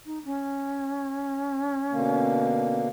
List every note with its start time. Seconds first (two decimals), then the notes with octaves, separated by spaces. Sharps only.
0.06 D#4
0.25 C#4
1.92 B2 D3 A#3